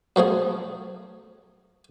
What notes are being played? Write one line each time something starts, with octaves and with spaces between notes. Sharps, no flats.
F#2 F3 A3 G#4